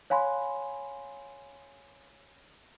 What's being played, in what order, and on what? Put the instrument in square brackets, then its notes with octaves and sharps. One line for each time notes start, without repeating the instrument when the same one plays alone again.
[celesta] C#5 F5 G#5 B5 C6